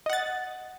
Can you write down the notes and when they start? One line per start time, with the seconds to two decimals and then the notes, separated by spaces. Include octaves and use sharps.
0.06 D#5
0.10 F#5
0.13 A6